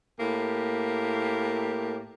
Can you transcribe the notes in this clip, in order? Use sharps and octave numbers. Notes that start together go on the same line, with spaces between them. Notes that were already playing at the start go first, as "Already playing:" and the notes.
A2 A#3 G4